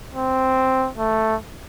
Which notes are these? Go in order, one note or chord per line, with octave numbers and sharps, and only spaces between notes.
C4
A3